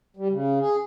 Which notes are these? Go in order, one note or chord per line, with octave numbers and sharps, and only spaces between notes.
G3
C#3
G#4